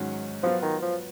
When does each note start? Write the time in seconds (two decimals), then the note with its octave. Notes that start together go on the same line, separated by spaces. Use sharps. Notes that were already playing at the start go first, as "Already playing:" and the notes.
Already playing: G#2 D#3 F#3 C#4 F#4
0.43 F3 F#3 B3 F4
0.63 D#3
0.82 F3